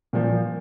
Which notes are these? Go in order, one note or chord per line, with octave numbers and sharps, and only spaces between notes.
A#2 F3